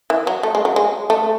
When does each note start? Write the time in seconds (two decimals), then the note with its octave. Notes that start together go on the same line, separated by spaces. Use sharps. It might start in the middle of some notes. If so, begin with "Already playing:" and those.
0.10 E3
0.27 F#3
0.43 A3
0.55 G#3
0.65 F#3
0.76 G#3
1.10 A3